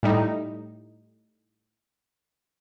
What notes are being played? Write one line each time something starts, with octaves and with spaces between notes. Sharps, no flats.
A2 G3 D#4